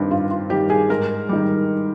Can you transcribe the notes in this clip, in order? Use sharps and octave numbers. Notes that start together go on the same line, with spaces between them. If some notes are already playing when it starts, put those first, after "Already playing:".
Already playing: G2 D#3 G3 C4 D4
G2 F4
F4
D#3 G3 G4
G#4
G#2 A#4
D#3 G3